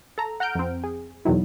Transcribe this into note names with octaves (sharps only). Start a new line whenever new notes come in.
A4 A#5
F#5 A#5 F6 G6 D7
F2 C4
G#4
E2 B2 D#3 F#3 E4